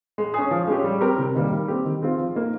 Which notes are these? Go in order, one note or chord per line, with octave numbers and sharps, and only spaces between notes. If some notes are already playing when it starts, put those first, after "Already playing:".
G#3
C#4 G#4
F3
G#3 C#4 G4
G3
C4 G4 A#4
C3
D#3 G3 A#3
G3
C4 G4
D#3
G#3 C4 F4
F3
A#3 D#4